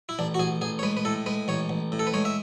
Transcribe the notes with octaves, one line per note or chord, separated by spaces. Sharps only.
E4
A1 D4
F#4
A1 G#4
A1 G#4
C#5
G#3 B4
B4
A2 A4
G#3 B4
A1 C#5
A1
A2
A4
B4
G#3 C#5
E5